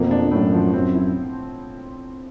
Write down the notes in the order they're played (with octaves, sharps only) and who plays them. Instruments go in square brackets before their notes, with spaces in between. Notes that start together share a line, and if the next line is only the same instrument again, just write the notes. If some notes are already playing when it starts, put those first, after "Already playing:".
Already playing: [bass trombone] F2 [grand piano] B2 A#3
[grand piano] D4
[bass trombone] F#2 [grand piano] A2
[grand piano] F3
[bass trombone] F#2 [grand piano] C4
[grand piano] E4